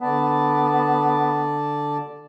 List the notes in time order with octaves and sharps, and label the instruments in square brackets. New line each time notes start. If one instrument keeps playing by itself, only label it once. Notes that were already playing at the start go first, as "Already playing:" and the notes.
[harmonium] D3 D5 A5 [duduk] B3